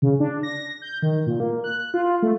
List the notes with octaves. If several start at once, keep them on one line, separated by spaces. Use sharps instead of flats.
C#3
D4
A#6
G6
D#3
A#2
A#3
F#6
F4
A3